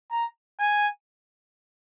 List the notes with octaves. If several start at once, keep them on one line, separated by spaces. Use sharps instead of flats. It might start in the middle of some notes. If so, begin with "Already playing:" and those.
A#5
G#5